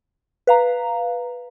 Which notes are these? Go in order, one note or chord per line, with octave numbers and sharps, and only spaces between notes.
B4 F5 A#5